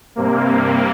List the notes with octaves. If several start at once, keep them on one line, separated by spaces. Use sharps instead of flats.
G2 C3 A#3